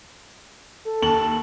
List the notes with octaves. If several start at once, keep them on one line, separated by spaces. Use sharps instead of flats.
A4
D#2 A5 F#7